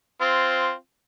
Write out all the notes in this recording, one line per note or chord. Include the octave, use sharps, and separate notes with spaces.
C4 F4